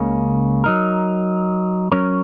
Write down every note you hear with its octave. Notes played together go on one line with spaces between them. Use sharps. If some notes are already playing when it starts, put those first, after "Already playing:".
Already playing: C#2 C#3 A#3 C#4
F#3 D#4 A#4
F#3 C#4 A#4 C#5